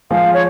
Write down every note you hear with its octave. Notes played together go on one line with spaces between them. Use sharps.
F3 G#3 F5
C#5